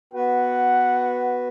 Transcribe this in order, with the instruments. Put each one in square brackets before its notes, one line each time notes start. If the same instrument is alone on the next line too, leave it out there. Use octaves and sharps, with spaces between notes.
[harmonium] B3 F#4 B4 [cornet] F#5